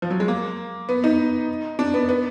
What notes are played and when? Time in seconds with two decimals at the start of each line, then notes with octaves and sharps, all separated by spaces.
0.02 F3
0.11 F#3
0.20 G#3
0.28 A#3
0.89 B3
1.04 D#4
1.79 D4
1.94 B3
2.09 B3